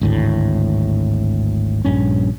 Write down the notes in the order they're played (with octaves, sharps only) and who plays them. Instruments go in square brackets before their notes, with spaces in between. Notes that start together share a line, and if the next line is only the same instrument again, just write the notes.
[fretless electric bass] G#1 D2 A2
A#1 G2 C#4